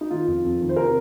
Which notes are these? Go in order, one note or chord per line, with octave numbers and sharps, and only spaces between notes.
D#4
D#3 F4
F2
F2
D#3
C5
C3 A#4